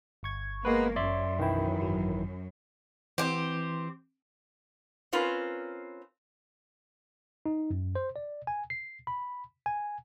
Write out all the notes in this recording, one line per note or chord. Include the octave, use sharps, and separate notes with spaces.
G1 C#6 G#6
G#3 A#3 B3 B4
F#2 D5 E5 C6
B1 D#3 E3 E4 G5
G#1 F#3
E3 C4 G4
C4 C#4 F4 A#4 B4
D#4
F#2
C5
D5
G#5
C7
B5
G#5